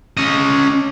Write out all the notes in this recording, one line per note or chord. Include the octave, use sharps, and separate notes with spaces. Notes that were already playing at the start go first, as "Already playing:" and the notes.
C#4 D#5